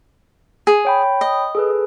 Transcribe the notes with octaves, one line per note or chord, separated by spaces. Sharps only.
G#4
C#5 G5 B5
D#5
G#4 A4 B4